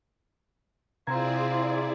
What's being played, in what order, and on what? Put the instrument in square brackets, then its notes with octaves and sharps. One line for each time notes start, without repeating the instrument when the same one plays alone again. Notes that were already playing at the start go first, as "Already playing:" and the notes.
[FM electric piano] C3 A#5 G#6 [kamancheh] C4 F4 [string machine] E4 G#4 D5